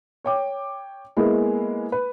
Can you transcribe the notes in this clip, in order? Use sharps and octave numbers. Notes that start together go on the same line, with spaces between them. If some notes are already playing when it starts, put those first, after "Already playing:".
C#5 G5 D6
G#3 A#3 B3 E4 G#4
B4